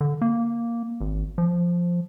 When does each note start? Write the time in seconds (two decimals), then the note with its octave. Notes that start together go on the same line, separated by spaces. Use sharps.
0.01 D3
0.22 A#3
1.01 G#1
1.38 F3